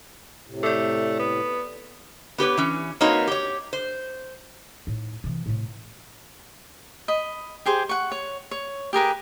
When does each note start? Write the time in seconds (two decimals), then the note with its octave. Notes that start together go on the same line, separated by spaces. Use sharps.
0.47 A2 C3
0.63 A3 A4 D5
1.19 B3
2.38 B3 G4 B4 C#5
2.57 E3 C#4
3.01 A#3 C4 D#4 F#4 B4 C#5
3.27 G4 C#5
3.73 C5
4.87 A2 D#4
5.24 C3 E3
5.46 A2 C3
7.08 D#5 B5
7.66 G4 G#4 C5
7.89 F#5 C#6
8.12 C#5
8.51 C#5
8.93 G4 G#4 A#4 B4